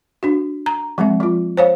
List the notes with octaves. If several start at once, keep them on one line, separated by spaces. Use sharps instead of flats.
D4 F#4
A#5
F3 G#3 C4 E5
F3 F4
C5 C#5 F5